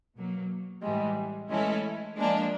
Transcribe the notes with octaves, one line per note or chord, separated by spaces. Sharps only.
B2 F#3 A#3
A2 E3 G3 G#3
E3 G#3 A3 C#4 E4 A4
F3 G#3 A#3 D4